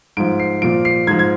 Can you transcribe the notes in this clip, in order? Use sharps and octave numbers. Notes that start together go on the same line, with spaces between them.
G#2 F3 D7
C7
A#2 F3 D7
C7
G#2 F3 G#6
G#6